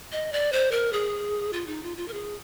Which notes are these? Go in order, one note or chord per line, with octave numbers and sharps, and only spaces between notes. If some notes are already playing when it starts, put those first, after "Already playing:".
D#5
D5
C5
A#4
G#4
F4
D#4
F4
F4
A#4
G#4